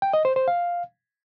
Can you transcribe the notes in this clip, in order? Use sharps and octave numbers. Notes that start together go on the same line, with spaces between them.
G5
D#5
C5
C5
F5